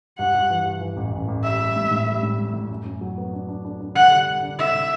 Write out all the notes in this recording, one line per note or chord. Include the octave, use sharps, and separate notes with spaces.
G2 F#5
G2
E3
G2
E3
A1
A1
A1
G3 E5
G3
A2
A2
G3
A2
A2
A2
F#2
F#2
F#3
B3
D4
D4
D4
D4
D3 F#5
G3
D3
D4
D3 E5
D3